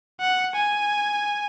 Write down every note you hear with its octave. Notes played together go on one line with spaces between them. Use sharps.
F#5
G#5